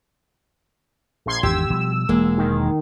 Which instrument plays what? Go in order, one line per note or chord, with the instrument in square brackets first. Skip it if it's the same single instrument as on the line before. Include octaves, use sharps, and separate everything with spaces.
[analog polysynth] A#1 C6 G#6
[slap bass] G#1 E2 D#3 [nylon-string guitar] G4 [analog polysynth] E6
[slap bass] B2 F3 G3
[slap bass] E1 E3 [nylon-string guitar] G#3 A#3
[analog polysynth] D#3